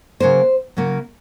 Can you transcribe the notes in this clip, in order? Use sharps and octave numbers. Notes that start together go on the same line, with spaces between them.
C#3 F#3 A#3 C5
C#3 F#3 A#3